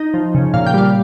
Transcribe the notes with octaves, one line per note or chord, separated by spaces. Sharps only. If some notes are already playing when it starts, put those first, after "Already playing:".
Already playing: D#4
F3
C#3
A#2 F5
G5
G3 F5